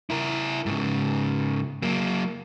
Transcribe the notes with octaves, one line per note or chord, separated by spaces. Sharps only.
E4 A#4
G#2 C#3
F#3 A#3